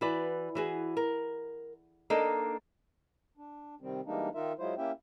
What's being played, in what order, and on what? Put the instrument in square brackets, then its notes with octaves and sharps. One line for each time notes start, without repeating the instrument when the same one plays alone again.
[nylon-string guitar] E3 F#4 B4 D5
E3 F#4 G#4
A#4
A#3 D4 D#4 A4 D#5
[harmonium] D4
C3 D#3 G3 C4
E3 G3 G#3 A#3 D4 D#4
D#3 D#4 F4 A#4 E5
F#3 G#3 E4 F4 C5
A#3 C#4 E4 G4 E5 G5